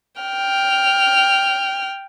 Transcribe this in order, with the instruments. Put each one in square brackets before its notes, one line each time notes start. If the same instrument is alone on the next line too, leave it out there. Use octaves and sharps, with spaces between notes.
[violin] G5 F6